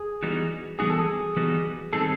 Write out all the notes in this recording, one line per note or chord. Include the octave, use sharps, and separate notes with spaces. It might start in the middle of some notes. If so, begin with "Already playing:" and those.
Already playing: G#4
E3 G3 B3 D#4 F#4
E3 G3 B3 D#4 F#4 G#4
A4
G#4
E3 G3 B3 D#4 F#4
D#3 G3 C4 D#4 G#4 A4